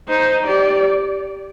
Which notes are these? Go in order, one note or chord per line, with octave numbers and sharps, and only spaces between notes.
D#4 C5
G4 D5